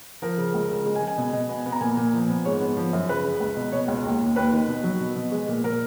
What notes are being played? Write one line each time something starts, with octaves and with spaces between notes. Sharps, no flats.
F3 A#4
C#3
C#2
C#3
G#3
G#5
G#3
G#5
B2
B2
B3
B3
A#5
A#2 G#5
A#2
F3
B3
G#2 C#5
B3
F3
F#2
C#3 B4
C#3
C#2
B2
B2 C#5
C#2
D#2
D#2
D#2 B4
D#3
B2
F#3
B2
B2
G#3
A#2
A#2 A#4